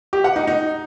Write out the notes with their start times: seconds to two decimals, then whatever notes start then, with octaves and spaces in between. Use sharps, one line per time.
0.13 G4
0.24 F#5
0.36 D#4
0.47 D#4